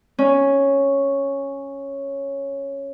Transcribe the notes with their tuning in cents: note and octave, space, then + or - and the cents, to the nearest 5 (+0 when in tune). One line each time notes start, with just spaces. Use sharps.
C#4 -5